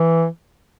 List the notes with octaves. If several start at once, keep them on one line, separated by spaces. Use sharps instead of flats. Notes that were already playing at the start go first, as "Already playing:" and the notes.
Already playing: E3